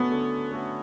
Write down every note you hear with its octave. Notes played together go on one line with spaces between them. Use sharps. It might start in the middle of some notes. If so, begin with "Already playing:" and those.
Already playing: D3 A3 B3 C#4 F#4
D3
A3 C#4 F#4